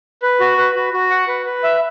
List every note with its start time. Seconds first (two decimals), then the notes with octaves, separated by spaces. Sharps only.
0.22 B4
0.40 F#4
0.58 B4
0.75 F#4
0.93 F#4
1.10 F#5
1.28 B4
1.46 B4
1.63 E5